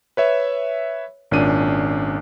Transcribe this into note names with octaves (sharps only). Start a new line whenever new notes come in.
B4 C#5 E5
G#1 A#2 C#4 D4 D#7